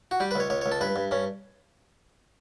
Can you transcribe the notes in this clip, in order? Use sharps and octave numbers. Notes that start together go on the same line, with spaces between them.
F#4
G3 G4
B4
C#2 C#5
C#2 C#5
C#5
C#2
A4
G2 B4
G2
G2 C#4